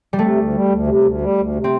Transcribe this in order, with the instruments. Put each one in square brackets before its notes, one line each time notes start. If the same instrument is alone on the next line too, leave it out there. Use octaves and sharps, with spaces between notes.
[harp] G3
[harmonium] C3 [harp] A3
[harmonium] D2
G3
D2
C3
D2
G3
D2
C3
[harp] C4